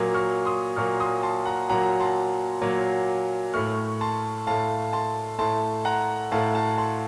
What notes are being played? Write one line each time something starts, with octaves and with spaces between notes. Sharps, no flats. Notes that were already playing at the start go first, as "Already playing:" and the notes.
Already playing: A#2 F#3 A#3 D#6
C#6 F6
C6 D#6
A#2 F#3 A#3 C#6 F6
C6 D#6
A5 C6
F#5 A#5
A#2 F#3 A#3 F#5 A#5
A5 C6
A#2 F#3 A#3
A2 A3 C#6 F6
A5 C6
A2 A3 F5 A5
A5 C6
A2 A3 A5 C6
F#5 A#5
A2 A3 F5 A5
F5 A5
A5 C6